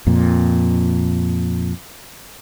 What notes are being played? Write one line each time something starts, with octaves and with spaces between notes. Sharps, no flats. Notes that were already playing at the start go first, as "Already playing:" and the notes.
F2 A#2